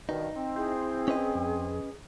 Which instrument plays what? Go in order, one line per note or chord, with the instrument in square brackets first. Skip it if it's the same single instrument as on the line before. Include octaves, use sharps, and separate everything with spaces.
[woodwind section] G2 B2 D#3 [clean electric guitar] D#4
[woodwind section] C4
[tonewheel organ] E4 C5 [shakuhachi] G#4
[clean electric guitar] C#4 B4 D#5
[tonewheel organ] F2